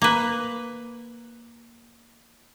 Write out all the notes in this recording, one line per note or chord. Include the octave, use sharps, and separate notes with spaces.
A#3 B4